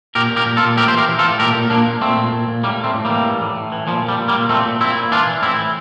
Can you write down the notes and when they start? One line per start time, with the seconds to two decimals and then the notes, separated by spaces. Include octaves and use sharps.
0.15 A#2 G4 A#4
0.31 A#2
0.36 G4 A#4
0.46 A#2
0.57 F4 A4
0.63 A#2
0.77 A2 G4 A#4
0.88 C5
0.93 E3 G4 A#4
1.09 E3
1.19 F4 A4
1.24 A2
1.40 A#2 G4 A#4
1.54 A#2
1.70 A#2 A#3 D4
1.87 A#2
2.01 A#2 A3 C4
2.17 A#2
2.32 A#2
2.48 A#2
2.64 A2 G3 A#3
2.80 A2 A3 C4
2.94 A2
3.05 E3 G3 A#3
3.25 A2
3.41 A2
3.57 A2
3.72 E3
3.87 A#2 F3
4.03 A#2
4.09 G3
4.19 A#2
4.28 G3 A#3
4.34 A#2
4.49 A#2 A3 C4
4.65 A#2
4.81 A#2 C4 E4
4.96 A#2
5.11 E3 D4 F4
5.27 E3
5.43 A2 C4 E4
5.59 E3